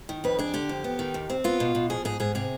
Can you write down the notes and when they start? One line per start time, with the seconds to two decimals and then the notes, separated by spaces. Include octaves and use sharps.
0.09 D#3
0.24 F2 B4
0.39 D4 G#4
0.54 D3 G4
0.69 F2
0.84 B3
0.99 D#3
1.14 D#2
1.30 C4
1.44 B3 F4
1.60 B2
1.75 B2
1.90 F3 G#4
2.05 G#2 G#4
2.20 G#2 G#4
2.35 C3 G#4